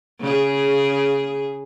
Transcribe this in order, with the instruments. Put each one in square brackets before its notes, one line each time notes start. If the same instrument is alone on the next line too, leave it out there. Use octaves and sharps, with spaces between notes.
[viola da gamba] C#3 G#4